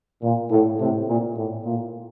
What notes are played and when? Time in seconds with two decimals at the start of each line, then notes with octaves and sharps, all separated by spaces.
0.21 A#2
0.50 A2
0.79 A2 C3
1.07 A#2
1.35 A2
1.64 A#2